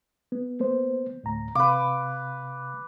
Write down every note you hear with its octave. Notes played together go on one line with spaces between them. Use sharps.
B3
A#3 B3 C5
D2 A2 A#5
C3 B4 F5 D6